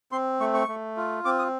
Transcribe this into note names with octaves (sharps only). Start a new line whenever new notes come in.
C4 C6
A3 C#6
C#6
A3
F4
C4 D6
D#6